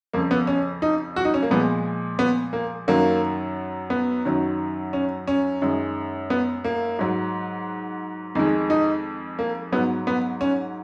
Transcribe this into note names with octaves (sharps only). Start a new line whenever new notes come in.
F2 C#3 F3 A#3
B3
C#4
D#4
F#4
D#4
C#4
A#3
A#2 F3 G#3 B3
B3
A#3
F#2 D#3 F#3 A#3
B3
F#2 D#3 F#3
C#4
C#4
F#2 D#3 G#3
B3
A#3
G#2 F#3
F2 D#3 G#3 D#4
D#4
A#3
G#2 F#3 B3
B3
C#4